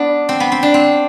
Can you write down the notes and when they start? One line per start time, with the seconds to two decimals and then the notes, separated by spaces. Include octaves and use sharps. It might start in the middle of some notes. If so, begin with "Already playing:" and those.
Already playing: B3 D4
0.29 C4
0.40 B3
0.52 C4
0.63 D4
0.74 C4